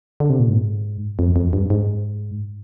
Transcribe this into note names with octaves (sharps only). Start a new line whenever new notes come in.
D3
C3
A#2
G#2
F2
F2
G2
G#2